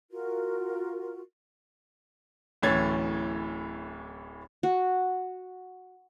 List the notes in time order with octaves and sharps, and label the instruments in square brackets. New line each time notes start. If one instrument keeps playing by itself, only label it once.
[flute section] F4 F#4 A#4
[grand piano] D1 A2 E3 C#4 G#6 A6
[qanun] F#4